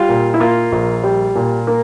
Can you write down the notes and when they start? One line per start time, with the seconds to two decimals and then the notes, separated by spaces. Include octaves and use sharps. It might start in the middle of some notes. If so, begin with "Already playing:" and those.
Already playing: G3 F4
0.09 A#2
0.34 E4
0.40 A#3 F4
0.72 A#1
1.03 G3
1.35 A#2
1.67 A#3